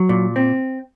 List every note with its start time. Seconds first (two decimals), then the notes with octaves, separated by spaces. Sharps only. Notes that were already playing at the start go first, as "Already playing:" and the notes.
Already playing: F#3
0.09 A#2
0.36 C4